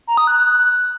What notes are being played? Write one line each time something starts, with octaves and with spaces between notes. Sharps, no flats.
A#5
D#6
F#6